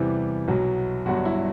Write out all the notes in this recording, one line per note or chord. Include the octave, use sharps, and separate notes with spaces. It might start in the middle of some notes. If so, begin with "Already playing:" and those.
Already playing: E2 C3 E3 G3 E4
B1 B2 F#3
G1 G2 F#3 F#4
E4